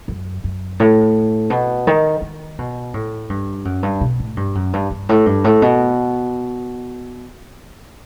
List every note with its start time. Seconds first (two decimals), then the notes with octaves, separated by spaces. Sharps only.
0.08 F#2
0.44 F#2
0.80 A2
1.50 B2
1.87 D#3
2.22 D#3
2.59 B2
2.94 A2
3.30 G2
3.65 F#2
3.83 G2
4.01 B2
4.20 A2
4.37 G2
4.55 F#2
4.73 G2
4.90 G2
5.09 A2
5.26 G2
5.44 A2
5.62 B2